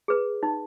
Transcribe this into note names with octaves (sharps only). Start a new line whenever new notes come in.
G#4 B4
D#4